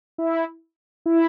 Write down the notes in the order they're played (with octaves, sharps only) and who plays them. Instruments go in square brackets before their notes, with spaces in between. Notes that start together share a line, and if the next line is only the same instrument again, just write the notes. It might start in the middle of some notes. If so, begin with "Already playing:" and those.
[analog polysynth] E4
E4